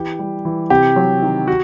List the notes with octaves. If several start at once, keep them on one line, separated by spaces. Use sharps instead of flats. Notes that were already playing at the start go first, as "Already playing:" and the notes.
Already playing: E3 G4
G3
E3
C3 G4
F#3
D#3
F#4